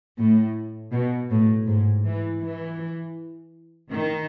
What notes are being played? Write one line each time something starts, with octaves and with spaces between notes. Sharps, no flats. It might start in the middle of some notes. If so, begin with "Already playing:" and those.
A2
B2
A2
G#2
E3
E3
D#3